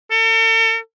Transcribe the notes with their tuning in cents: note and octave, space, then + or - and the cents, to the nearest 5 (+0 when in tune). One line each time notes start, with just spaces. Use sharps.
A4 +45